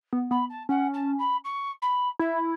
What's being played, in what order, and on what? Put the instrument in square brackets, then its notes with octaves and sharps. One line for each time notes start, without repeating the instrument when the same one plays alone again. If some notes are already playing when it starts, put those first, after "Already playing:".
[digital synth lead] B3
[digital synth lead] B3 [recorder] B5
[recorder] A5
[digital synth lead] C#4 [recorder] F#5
[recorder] A5
B5
C#6
B5
[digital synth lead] E4 [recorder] E5